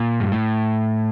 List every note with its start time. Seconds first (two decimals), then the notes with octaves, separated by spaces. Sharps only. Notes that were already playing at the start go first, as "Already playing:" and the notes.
Already playing: A#2
0.20 G2
0.32 A2